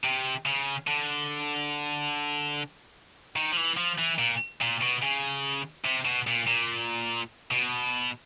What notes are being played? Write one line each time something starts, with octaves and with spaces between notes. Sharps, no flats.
C3
C#3
D3
D#3
F3
E3
F3
E3
A#2
A#2
B2
C#3
C3
B2
A#2
A#2
B2